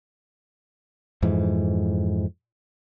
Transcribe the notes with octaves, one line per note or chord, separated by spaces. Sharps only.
F2 G#2 E3